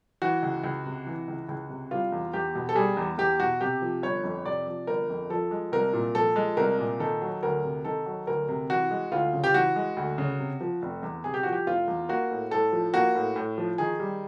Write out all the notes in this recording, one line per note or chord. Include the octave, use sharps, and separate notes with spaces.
E3 F#4
C#2
C#2
C3
E3
C#2
C#2
C3
G3 F4
E2
E2 G4
B2
A4
G3 G#4
E2
E2 G4
B2 F#4
C3 G4
F3
G1 C#5
F2
C3 D5
F3
G1 A#4
F2
F3 A4
G#3
C2 A#4
A#2
F3 A4
G#3
C2 A#4
A#2
D#3 A4
F#3
D2 A#4
C3
D#3 A4
F#3
D2 A#4
C3
E3 F#4
G#3
D2 F4
C#3
G4
E3 F#4
G#3
D2
C#3
C3
F3
F1
E2
C3 G#4
G4
F3 F#4
G4
F1 F4
E2
A#3 F#4
A2
A2 A4
F3
A#3 F#4
A2
A2
F3
D#3 G#4
G3